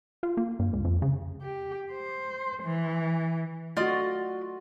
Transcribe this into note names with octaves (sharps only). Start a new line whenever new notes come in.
F4
A#3
G2
C#2
F2
C#3
G4
C5
E3
A3 F4 F#4 D5 D#5